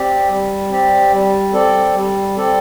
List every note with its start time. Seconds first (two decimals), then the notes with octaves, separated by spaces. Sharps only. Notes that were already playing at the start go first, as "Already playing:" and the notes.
Already playing: C4 G4 D5
0.29 G3
0.71 C4 G4 D5
1.12 G3
1.53 C4 A4 D5
1.95 G3
2.36 C4 A4 D5